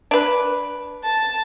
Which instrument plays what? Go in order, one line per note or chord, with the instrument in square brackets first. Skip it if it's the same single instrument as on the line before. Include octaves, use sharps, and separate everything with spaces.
[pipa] D4 B4
[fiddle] A5